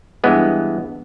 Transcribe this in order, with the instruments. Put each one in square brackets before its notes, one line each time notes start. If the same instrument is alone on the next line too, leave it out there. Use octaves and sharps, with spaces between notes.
[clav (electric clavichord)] G2 E3 G#3 B3